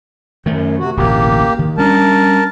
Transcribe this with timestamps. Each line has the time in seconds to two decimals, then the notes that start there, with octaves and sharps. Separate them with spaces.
0.46 F#2 D#3 A3
0.79 C3 F#4
0.97 D1 A1 B2 A#3 G4
1.59 D#3
1.78 G3 C#4 D4 A#4 A5